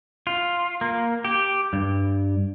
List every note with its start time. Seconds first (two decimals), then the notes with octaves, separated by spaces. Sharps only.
0.27 F4
0.81 A#3
1.25 G4
1.73 G2